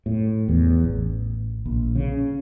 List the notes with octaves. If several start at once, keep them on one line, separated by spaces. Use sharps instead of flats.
A2
E2
A1
A#1
C#3